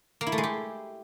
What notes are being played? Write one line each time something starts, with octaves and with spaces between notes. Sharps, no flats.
A#3
E4
A3
G#3
G4